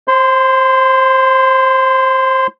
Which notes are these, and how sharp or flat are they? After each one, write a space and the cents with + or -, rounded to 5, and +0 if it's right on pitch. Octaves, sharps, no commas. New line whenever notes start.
C5 +20 C6 -20